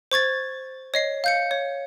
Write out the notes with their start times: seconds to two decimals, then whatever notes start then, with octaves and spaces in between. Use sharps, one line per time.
0.12 C5 C#6 G#6 A6
0.94 C#5 D#5 C7
1.24 F5 G6 C#7
1.51 C#5